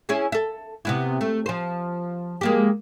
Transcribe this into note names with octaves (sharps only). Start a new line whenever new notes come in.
C#4 E4 G#4
A4 E5
C3 B3 E4
A3
F3 C5
G#3 A#3 G4